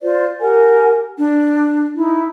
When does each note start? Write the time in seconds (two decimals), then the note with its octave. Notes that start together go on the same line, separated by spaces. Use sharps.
0.02 F4 C5 D5
0.40 G4 A#4 F#5 G#5
1.18 D4
1.95 D#4 E4